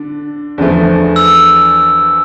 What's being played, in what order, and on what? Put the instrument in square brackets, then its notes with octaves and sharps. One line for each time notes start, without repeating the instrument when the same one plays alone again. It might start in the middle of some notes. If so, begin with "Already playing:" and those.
Already playing: [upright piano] D3 D4
E2 D3 F3 A3
[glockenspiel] E6